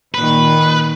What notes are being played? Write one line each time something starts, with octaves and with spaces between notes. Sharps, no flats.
A#2 D#3 B4